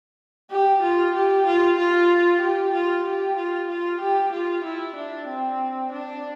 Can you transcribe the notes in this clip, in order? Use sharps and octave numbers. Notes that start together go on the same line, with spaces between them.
G4
F4
G4
F4
F4
G4
F4
G4
F4
F4
G4
F4
E4
D4
C4
D4